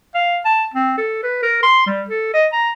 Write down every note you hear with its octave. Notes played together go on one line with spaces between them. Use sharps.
F5
A5
C4
A4
B4
A#4
C6
G3
A4
D#5
A#5